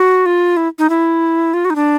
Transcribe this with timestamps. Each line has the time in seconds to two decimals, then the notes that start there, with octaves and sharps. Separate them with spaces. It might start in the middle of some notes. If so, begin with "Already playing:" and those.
Already playing: F#4
0.26 F4
0.57 E4
0.79 D#4
0.90 E4
1.54 F4
1.65 F#4
1.70 D#4
1.75 D4